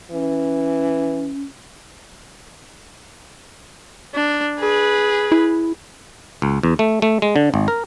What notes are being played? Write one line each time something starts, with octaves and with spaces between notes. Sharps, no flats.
E3 C#4
D4
G#4 B4
E4
C#2
E2
A3
A3
G#3
D3
G#1
A#4